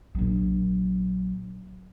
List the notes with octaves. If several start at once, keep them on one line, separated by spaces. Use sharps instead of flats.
A#1 F#3